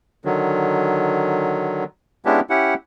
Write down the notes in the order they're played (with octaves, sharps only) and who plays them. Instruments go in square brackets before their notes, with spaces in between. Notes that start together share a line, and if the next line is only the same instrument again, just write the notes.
[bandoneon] D3 D#3 F#3
G#3 B3 C#4 D4 E4 G4
C#4 E4 G4 F#5